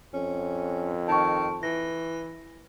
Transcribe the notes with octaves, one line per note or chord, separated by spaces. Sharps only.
F2 C#4
D#3 A5 C#6
E3 A#6